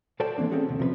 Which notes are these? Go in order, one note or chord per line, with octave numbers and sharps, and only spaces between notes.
F#4 A4 C5 D5 G5 A5
E3 A#3 C4 D4
C4 C#4 F#4 G#4 A4
D#2 C3
C3 F3 A#4 B4